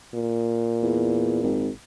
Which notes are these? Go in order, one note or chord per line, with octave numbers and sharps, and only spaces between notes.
A#2
E2
G#1